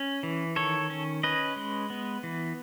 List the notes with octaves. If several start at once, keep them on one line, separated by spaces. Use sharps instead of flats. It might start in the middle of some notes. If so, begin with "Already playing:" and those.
Already playing: C#4
E3
D#3 A4 C#5
C#4
C#4 B4 D#5
G#3
B3
E3